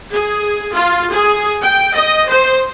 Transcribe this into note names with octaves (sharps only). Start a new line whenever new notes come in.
G#4
F4
G#4
G5
D#5
C5